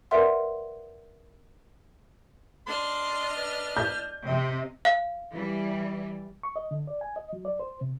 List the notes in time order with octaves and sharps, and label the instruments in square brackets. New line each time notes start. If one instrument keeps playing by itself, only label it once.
[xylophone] A#4 B4 D5 E5 F#5 C6
[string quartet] D4 D#5 F6 [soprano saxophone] C6
[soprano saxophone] B4
[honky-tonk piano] G6
[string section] C3 [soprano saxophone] D#5
[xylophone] F5
[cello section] E3 G3
[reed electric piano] C#6
D#5
D3
D5
G#5
D#5
F#3
D5
C5
C3